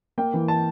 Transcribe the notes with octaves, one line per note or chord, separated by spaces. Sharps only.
A#3 G5
E3
A5